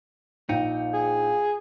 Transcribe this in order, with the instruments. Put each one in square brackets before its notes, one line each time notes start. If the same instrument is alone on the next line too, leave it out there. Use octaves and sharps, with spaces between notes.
[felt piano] A#1 G5 C#7 [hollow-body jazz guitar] D#4
[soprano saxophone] G#4